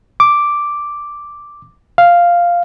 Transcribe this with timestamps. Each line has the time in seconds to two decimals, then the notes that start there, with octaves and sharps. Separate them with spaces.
0.20 D6
1.98 F5